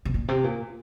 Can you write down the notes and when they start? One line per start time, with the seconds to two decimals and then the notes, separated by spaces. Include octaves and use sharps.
0.05 B2
0.14 A#2
0.28 C3
0.44 A#2